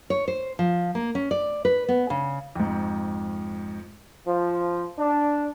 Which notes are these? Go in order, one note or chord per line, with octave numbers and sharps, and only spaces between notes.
C#5
C5
F3
A#3
C#4
D5
B4
B3
C#3
F2 G#2
F3
D4